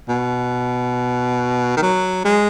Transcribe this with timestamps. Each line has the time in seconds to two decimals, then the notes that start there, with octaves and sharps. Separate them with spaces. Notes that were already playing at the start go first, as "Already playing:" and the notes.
0.08 B2
1.76 D#3
1.82 F#3
2.25 G#3